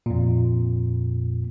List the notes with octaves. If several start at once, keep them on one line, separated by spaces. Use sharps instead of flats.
F2 A#2